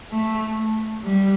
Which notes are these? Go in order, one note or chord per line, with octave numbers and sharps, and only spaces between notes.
A3
G3